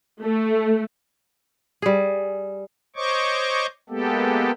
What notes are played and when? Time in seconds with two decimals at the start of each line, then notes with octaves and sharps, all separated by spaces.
0.21 A3
1.82 G3 G#4
2.96 C5 C#5 D#5 C#6 D6
3.90 G#3 A#3 B3 G4 A4